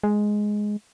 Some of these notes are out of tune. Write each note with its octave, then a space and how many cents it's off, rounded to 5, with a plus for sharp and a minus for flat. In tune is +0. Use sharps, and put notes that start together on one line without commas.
G#3 +5